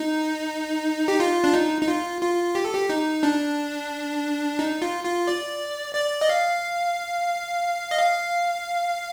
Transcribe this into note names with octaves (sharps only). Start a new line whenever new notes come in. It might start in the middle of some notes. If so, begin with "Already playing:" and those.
Already playing: D#4
G4
F4
D4
D#4
D#4
F4
F4
G4
A4
G4
D#4
D4
D#4
F4
F4
D5
D5
D#5
F5
D#5
F5